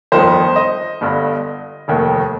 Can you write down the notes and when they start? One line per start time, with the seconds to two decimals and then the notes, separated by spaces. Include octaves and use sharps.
0.12 G1 F2 D#3 C5
0.56 D#5
1.01 G1 G2 D3
1.88 F1 D#2 D#3